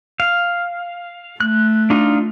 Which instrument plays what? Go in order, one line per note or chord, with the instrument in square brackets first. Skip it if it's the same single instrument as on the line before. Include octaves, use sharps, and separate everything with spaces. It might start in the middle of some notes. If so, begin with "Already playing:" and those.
[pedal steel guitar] F5
[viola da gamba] A3 [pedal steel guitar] F#6
[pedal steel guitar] D4 D#4 F4